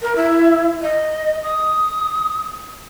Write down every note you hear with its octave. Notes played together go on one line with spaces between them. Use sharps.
A#4
E4
D#5
D#6